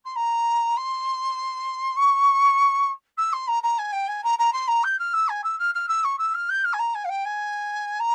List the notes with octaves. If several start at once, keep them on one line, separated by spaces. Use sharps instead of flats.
C6
A#5
C6
C#6
E6
C6
A#5
A#5
G#5
G5
G#5
A#5
A#5
C6
A#5
G6
F6
E6
G#5
E6
F6
F6
E6
C#6
E6
F6
G6
F6
G#5
A#5
G#5
F5
G5
G#5
A#5